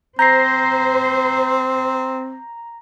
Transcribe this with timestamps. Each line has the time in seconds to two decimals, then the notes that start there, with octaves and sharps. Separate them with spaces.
0.19 C4 C5 A#5 G6 A#6 C7